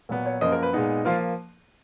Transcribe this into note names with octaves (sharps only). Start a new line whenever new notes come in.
A#2 F#3 B3
C#5
F#2 F3 A#3 D#5
A#4
B4
A#2 G#3 B3 D#4
F3 A#3 F4